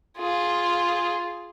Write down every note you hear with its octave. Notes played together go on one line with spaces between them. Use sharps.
F4 G#4